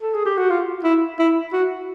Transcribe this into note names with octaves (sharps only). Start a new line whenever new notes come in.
A4
G#4
G4
F#4
F4
E4
E4
F#4